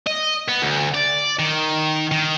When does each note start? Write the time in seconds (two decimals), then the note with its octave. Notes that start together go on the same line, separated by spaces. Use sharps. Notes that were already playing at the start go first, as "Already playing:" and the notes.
0.07 D#5
0.49 B3
0.62 D2
0.95 D5
1.39 D#3
2.11 D#3